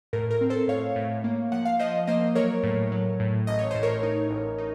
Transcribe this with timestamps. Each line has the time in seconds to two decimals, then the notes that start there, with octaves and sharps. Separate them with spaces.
0.13 A2 A#4
0.31 A#4
0.41 C4
0.50 A4 C5
0.68 A2 C#5 F5
0.96 A2
1.24 A#3
1.52 F3 F#5
1.65 F5
1.79 F3 C5 D#5
2.07 A#3 C5 D#5
2.35 F#3 A#4 C#5
2.63 A2
2.92 F#3
3.20 A2
3.47 A1 D#5
3.59 C#5
3.71 A2 C5
3.83 A#4 C#5
4.03 D#4
4.31 A1
4.58 D#4